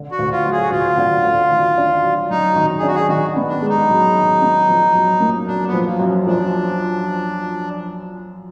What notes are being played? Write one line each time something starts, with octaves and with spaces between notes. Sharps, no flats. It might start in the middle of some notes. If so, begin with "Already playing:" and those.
Already playing: D3
F#4
D2
F4
F#3
G#4
F#4
D2 F4
D3
D2
D#3
D4
F#3
F#2 D#4
D#3
G#4
D4 F#4
G#4
D#3 F#4
B3
D4
G#3
D#4
F#2
D#3
B3
F3
F#2
A#3
F#2 D4
B3
F3
A#3
F#2
F3 D4